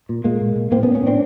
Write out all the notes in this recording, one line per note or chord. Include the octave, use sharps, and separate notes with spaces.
A#2
A#2 G#3 A#3
A#2
A#2
A2 A#3 C4
B3 C#4
A2
B3 C#4
A2 C4 D4